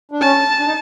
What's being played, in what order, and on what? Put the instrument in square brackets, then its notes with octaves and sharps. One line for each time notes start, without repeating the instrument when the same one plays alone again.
[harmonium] D4
[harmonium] C#4 [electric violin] A5
[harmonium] D4
D#4